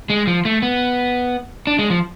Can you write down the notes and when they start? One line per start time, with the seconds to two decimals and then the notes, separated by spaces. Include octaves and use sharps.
0.10 G#3
0.27 F3
0.45 A3
0.62 B3
1.67 D4
1.79 G#3
1.90 F3